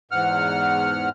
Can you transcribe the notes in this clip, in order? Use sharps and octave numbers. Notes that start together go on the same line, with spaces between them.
E2 G#2 F#5 F6